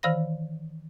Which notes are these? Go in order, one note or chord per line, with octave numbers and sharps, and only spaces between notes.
D#3 E3 C5 F5 B5 A#6